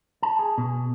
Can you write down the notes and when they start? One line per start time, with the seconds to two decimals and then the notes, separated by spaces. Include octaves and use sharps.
0.23 A5
0.39 G#4
0.58 B2